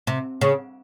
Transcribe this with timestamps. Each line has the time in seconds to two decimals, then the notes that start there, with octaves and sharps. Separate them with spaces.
0.07 C3
0.41 C#3